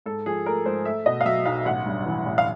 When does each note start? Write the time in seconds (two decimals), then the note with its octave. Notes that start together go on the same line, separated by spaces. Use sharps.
0.06 G#2 A4
0.26 F3 G#4
0.46 A3 A#4
0.66 G#2 C5
0.85 A3 E5
1.06 B2 D#5
1.21 F5
1.25 F#3 E5
1.46 B1 F5
1.65 A1 F#5
1.86 G2
2.06 E3
2.26 A1
2.38 F5